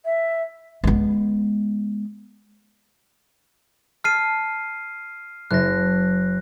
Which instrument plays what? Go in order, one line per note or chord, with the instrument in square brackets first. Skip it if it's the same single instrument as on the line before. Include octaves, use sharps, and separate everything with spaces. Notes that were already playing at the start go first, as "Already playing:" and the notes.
[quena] E5
[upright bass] G#3 B3
[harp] A5 [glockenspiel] F6 C7 D#7
[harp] F#1 [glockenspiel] F#6 A#6